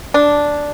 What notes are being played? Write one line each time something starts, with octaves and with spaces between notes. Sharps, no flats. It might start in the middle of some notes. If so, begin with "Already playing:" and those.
D4